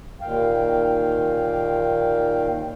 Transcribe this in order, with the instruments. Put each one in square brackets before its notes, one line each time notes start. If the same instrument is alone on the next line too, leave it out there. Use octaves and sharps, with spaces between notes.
[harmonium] D#2 A#2 D#3 F5 G5